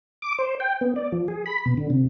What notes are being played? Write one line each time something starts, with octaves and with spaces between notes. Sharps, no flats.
D6
C5
G5
B3
D5
F3
G#4
B5
B2
D3
C3